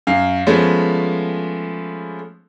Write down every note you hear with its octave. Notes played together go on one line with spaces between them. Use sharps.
F#2 F5
F3 G#3 A3 B3 C#4